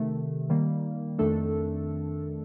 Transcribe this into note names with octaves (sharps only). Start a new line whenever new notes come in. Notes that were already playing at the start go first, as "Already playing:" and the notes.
Already playing: C3 D#3 A3
D#3 G3 A#3
F2 D#3 A3 D4 A4